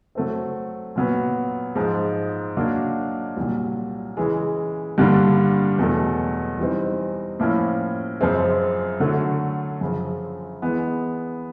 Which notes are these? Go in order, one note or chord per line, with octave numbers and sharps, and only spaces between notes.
F#3 A3 C4
A#2 F#3 B3
G#2 F3 G#3
F#3 A#3 D4
C2 A#2 F#3
C#3 E3 G#3
G2 D3 G3 A#3 D4
E2 B2 F#3 A3
E3 G3 C4 D#4
A2 F3 A#3 C#4 E4
F#2 C#3 F3 G#3 C4
D3 F#3 A3
F#2 C#3 F3
E3 G#3 B3